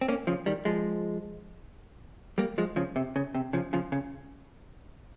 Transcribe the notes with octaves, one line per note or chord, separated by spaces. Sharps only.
C4
A#3 C#4
C#3 F3
D#3 G3
F3 G#3
G3 A#3
F3 G#3
C#3 F3
C3
C#3
C3
C#3 F3
C#3 F3
C#3